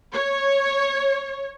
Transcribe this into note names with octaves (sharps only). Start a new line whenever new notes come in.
C#5